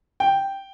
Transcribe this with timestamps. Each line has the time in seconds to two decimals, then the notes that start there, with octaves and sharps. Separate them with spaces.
0.20 G5